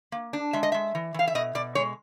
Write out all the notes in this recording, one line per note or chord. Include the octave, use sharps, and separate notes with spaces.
A#3
D4
G#3 E5
D#5
G#3 E5
E3
E3 F5
E5
B2 D#5
B2 D5
G#3 C#5